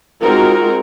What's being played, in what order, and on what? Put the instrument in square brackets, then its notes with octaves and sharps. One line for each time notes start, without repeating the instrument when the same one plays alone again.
[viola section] G#3 C4 D#4 F4 F#4 A#4